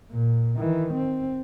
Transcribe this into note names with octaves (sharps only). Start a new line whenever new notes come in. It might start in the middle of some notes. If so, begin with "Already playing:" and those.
A#2
D#3 E3
C4